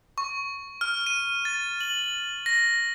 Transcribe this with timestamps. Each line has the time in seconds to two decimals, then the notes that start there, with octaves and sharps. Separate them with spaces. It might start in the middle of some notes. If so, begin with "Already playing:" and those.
0.18 C#6
0.81 F6
1.07 D#7
1.45 A6
1.81 F#7
2.46 A#6